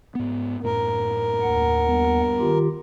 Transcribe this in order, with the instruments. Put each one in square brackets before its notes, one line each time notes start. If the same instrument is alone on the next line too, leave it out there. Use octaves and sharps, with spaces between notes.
[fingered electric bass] G#2 B3
[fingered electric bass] F#2 A2 [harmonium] A#4
[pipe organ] D#2 F#5
[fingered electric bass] G2 B3
[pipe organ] D#3 F4 G4